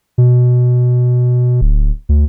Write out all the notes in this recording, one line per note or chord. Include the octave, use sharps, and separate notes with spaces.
B2
D1
D2